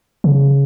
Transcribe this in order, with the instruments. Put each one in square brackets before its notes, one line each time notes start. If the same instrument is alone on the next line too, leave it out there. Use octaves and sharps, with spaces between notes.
[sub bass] C#3